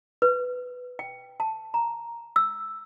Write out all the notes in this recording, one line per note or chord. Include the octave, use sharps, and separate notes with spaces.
B4
G5
A5
A#5
E6